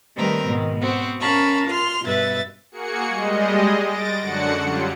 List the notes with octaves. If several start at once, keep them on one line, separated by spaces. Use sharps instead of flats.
D#3 G3 A3 C4 A#4 B4
G#2 B2 D#3
B3 C4 F#4 C5
C#4 A#4 F5 A5 B5 C#6
F4 C6 F6
G2 B2 B4 E5 A6
A#3 F#4 G#4 C#7
G3 G#3 D#5
A6 A#6 D7
F#2 D3 D4 F#4 F#5 C#7
F#3 G3 F4